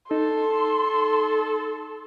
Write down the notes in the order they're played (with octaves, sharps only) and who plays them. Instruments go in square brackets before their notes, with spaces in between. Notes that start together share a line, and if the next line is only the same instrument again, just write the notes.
[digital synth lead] D#4 [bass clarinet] A4 [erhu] C6